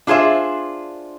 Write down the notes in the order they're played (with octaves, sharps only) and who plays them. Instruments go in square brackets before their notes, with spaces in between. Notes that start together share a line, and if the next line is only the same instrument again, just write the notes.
[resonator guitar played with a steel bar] D4 F4 G#4 C5 E5